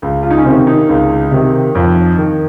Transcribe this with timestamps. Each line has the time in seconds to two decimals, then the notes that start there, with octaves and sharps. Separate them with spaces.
0.02 C#2
0.23 F4
0.30 D#4
0.38 C#4
0.45 C3 D#3 C4
0.67 D#4
0.89 C#2
1.31 C3 D#3
1.75 F2
2.18 D#3